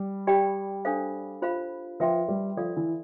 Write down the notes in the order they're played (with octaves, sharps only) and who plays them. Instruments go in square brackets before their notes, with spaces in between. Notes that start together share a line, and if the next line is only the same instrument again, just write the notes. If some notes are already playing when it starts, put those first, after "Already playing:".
Already playing: [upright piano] G3
[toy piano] G4 D5 G5 B5
D4 A4 C5 F5
F4 C5 F5 B5
[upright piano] F3 [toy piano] B4 E5 G5 C6
[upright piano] G3
[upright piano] F3 [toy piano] A4 D5 F5 B5
[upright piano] E3